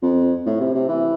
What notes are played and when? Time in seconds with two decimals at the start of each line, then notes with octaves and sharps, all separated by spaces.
0.02 F2
0.46 A2
0.60 C3
0.75 C3
0.88 E3